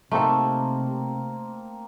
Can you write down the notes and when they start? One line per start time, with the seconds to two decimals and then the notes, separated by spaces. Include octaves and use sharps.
0.11 C3 A3 A#3 C4 D#4 A4